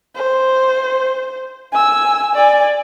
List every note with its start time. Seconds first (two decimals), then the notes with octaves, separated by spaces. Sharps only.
0.16 C5
1.73 G#5 E6
2.35 D5 G#5